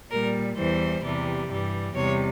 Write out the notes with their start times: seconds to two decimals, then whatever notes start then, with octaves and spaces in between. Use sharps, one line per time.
0.11 A#2 G3 A#4
0.57 E2 E3 G3 C5
1.04 E2 C3 E3 G3
1.49 G2 E3 G3
1.95 E2 C3 G3 C#5